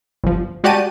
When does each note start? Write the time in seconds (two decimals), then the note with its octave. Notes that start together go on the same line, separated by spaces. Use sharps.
0.24 G1 F3
0.64 G#3 F#4 G4 D5 A5 D#7